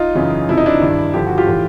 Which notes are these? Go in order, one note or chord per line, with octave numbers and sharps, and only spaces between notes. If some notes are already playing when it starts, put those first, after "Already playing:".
Already playing: D#4 F4
F#2 C#3 E3
F2 C3 F3 E4
D#4
D4 E4
G2 D#3
G2 D3 F3 G4
F#4
F4 G4
A2 E3